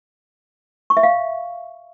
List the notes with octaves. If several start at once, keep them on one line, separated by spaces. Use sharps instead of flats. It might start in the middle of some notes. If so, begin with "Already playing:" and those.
C#6
E5
F5